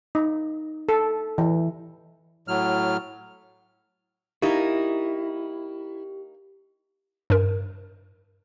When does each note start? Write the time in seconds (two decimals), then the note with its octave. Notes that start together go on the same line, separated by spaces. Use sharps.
0.15 D#4
0.89 A4
1.38 E3
2.48 A2 F#3 F6
4.42 A#3 D#4 E4 G4
7.30 G2 A#4